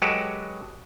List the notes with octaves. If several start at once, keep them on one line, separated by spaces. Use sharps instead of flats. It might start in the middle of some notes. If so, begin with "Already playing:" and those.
F#3 G#3 F#4 G4 A4 B4